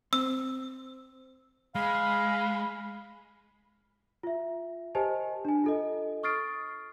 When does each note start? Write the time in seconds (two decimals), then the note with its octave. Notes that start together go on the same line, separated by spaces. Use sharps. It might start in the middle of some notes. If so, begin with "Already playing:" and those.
0.13 C4 E6
1.75 G#3 F5 B5
4.23 F4 E5
4.95 G4 A#4 C5 D#5 G#5 A5
5.45 D4 G#5
5.64 F4 A4 D#5
6.23 C#6 D#6 F6 A6 C7 D7